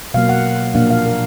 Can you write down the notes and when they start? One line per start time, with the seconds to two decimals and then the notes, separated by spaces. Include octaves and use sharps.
0.14 B2 F#3 A#3 F5
0.29 F#5
0.74 A#2 F3 A#3 D4 F5
0.90 F5
1.06 A#4